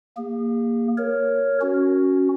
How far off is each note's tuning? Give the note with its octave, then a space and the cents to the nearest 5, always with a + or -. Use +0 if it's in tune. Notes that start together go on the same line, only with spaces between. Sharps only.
A#3 +0 G#4 -45
A#4 +0 C#5 +0
C#4 +0 F#4 +5